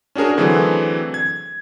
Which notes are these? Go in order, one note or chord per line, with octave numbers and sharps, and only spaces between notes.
C#4 D4 F#4 G#4 A#4
D3 E3 F#3 A3 C4 G#4
G#6